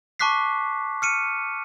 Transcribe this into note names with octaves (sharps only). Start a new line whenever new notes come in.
A5 C#6 D6 F#6 B6 C7
F6 C#7 D#7